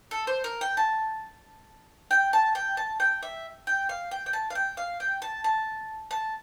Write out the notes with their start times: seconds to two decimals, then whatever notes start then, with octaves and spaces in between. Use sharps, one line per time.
0.11 A4
0.27 C5
0.44 A#4
0.61 G5
0.77 A5
2.11 G5
2.33 A5
2.55 G5
2.77 A5
3.00 G5
3.22 E5
3.67 G5
3.89 F5
4.11 G5
4.26 G5
4.33 A5
4.50 F5
4.55 G5
4.77 F5
5.00 G5
5.22 A5
5.44 A5
6.11 A5